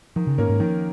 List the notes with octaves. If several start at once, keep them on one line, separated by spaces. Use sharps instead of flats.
D#3 F3
C#3
G#2 A#3 C#4 A#4
G#2
D#3 F3